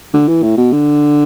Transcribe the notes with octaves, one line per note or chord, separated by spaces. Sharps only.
D3
E3
A2
B2
D3